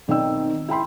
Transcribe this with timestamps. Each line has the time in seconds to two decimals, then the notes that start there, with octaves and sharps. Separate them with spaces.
0.08 B1 D#3 C4 D5 G5 E6
0.68 E4 G5 B5 C6